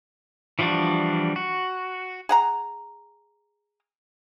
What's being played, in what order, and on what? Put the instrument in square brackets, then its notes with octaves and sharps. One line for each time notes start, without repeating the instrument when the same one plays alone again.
[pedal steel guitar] E3 F3 G3 D4 F#4
F#4
[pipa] G#4 F#5 A#5